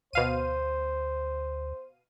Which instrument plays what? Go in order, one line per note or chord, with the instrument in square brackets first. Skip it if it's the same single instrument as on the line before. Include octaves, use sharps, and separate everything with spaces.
[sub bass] D2 [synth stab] B2 F5 D#7 [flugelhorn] C5